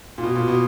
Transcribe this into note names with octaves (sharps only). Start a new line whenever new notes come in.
A#2
B2
A#2
B2